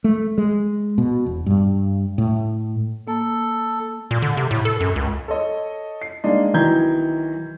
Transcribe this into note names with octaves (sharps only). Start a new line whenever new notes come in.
A3
G#3
B2
E1
G2
A2
A#3 A4
A#2
D3
C3
A2
A4
F#2
C#2
A4 C#5 D#5
C7
G#3 A#3 D4 D#4 D5 D#5
B1 D#3 E3 A#5 G6 G#6